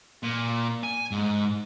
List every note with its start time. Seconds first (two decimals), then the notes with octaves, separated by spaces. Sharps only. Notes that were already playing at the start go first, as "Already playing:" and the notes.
0.23 A#2
0.83 G#5
1.11 G#2